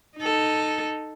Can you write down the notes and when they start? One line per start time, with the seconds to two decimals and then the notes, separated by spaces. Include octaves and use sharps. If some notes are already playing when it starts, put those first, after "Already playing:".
0.17 D#4 A4